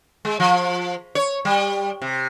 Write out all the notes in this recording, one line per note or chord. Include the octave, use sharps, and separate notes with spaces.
G#3
F3
C#5
G3
C3